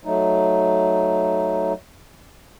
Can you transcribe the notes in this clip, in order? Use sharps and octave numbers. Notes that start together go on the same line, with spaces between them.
F#3 A3 D#4